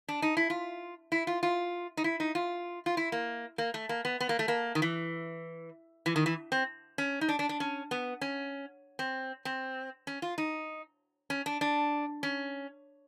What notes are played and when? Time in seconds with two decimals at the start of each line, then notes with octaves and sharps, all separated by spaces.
0.08 D4
0.22 D#4
0.37 E4
0.50 F4
1.12 E4
1.27 F4
1.43 F4
1.97 D#4
2.04 E4
2.20 D#4
2.35 F4
2.86 F4
2.97 E4
3.12 A#3
3.58 A#3
3.74 A3
3.89 A#3
4.05 B3
4.20 B3
4.29 A#3
4.39 A3
4.48 A#3
4.75 D#3
4.82 E3
6.06 E3
6.16 D#3
6.26 E3
6.52 C4
6.98 C#4
7.21 D#4
7.29 D4
7.39 D4
7.49 D4
7.60 C#4
7.91 B3
8.21 C#4
8.99 C4
9.45 C4
10.07 C#4
10.22 F4
10.38 D#4
11.30 C#4
11.46 D4
11.61 D4
12.23 C#4